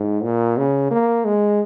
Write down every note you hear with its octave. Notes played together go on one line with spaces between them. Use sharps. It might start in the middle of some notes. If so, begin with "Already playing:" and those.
Already playing: G#2
A#2
C#3
A#3
G#3